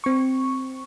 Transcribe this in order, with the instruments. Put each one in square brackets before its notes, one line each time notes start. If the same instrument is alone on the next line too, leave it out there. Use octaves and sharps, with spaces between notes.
[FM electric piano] C4 C#6